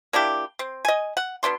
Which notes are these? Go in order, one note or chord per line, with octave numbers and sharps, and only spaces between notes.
A#3 D4 E4 G4
C4
D#5 G#5
F#5
B2 B3 D4 C6